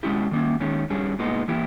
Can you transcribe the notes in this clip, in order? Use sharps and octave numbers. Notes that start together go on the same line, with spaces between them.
B2 G#3 C#4 E4 G4
D#3 A#3 C#4
D#3 G#3 C#4
G2 G3 C#4 G#4
A#2 G#3 B3 D#4
E3 A#3 E4 G4